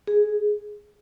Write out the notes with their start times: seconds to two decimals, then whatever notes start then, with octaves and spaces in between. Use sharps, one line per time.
0.07 G#4